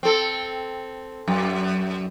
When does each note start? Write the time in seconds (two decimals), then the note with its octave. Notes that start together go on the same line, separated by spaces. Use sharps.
0.03 C4 A4
1.28 F#2